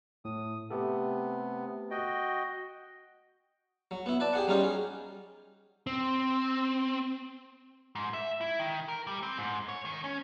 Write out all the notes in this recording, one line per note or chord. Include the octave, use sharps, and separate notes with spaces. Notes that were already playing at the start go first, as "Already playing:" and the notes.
A2 D#6
C3 A3 B3 G4 A4
F#4 D#5 G5
F#3
B3 E4
B4 D5 A5
G4 G#4 F#5
F#3 G3 C#4 D#4 F4 G4
G#4
C4
G#2
E5
E4
D#3
A#4
G3
C4
G#2
C#5
D#3
C#4